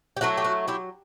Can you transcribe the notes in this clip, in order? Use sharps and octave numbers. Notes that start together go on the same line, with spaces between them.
G4
F#3 A3 E4 F#4
G4
F#4
E4 G4